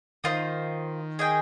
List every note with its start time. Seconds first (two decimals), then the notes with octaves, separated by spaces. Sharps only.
0.24 D#3 F4 C5 D#5
1.19 G#4 D#5 G5